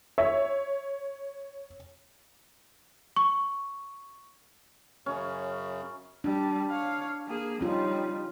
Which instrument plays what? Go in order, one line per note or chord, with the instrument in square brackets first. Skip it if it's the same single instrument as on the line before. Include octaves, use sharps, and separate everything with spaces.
[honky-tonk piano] C#5 [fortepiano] E5
[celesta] C#6
[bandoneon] F#2 C#3 [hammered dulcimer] C#4
[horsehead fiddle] G3 [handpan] D4
[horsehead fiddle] C#5 F5
A#3 G#4
[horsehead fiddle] G3 D#4 [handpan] C#4 F4